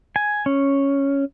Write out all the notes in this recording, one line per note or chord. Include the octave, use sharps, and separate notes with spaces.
G#5
C#4